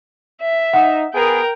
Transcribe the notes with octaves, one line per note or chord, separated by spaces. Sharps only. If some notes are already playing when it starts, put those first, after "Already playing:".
E5
D#4 F#5
B3 G#4 A#4 G5